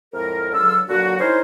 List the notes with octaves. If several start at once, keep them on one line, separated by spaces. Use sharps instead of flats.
F2 A2 G#3 A#4
C#2 D3 F#3 F4 E6
A#2 D3 F#3 F#4
C#4 D#4 E4 G#4 A#4 C5